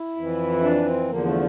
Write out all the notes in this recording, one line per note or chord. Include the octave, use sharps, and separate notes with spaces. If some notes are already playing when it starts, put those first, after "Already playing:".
Already playing: E4
F2 E3
D4
C4
E2 D3 F3 A#3
A3